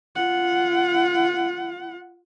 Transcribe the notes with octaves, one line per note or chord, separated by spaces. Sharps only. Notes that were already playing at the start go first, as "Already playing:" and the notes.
F4 F#5